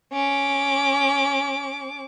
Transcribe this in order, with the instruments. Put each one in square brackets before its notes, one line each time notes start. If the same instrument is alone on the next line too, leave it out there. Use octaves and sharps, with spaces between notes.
[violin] C#4 D6